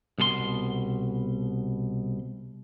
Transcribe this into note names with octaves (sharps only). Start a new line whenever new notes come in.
C2 B2 A4 C6